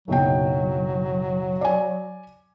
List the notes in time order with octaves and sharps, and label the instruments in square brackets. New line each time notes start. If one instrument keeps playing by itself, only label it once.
[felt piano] F#1 B1 G5 [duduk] F#3
[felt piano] D5 G#5